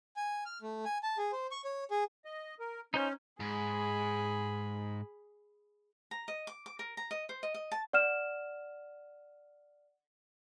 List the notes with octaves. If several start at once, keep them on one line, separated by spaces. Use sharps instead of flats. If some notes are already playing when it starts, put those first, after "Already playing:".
G#5
F6
A3
G#5
A5
G#4
C5
C#6
C#5
G#4
D#5
A#4
C#4 D#4 C5 G6
G#2 G#4 B5
A#5
D#5
D6
D6
A#4
A#5
D#5
C5
D#5
D#5
A5
D5 F#5 F6 E7